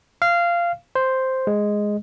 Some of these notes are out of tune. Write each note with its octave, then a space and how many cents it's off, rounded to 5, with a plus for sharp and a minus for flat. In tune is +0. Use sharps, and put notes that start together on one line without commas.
F5 -15
C5 +0
G#3 +0